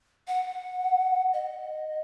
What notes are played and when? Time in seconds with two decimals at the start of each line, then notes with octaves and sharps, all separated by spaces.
0.27 F#5
1.33 D#5